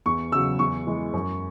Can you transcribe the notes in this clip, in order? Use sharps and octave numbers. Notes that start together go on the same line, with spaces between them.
E2 C#6
C#3 F#3 E6
E2 C#6
E3 G#3
F#2